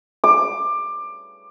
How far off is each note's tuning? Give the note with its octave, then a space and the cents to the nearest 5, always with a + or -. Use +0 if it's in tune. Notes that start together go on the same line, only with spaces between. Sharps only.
D6 +20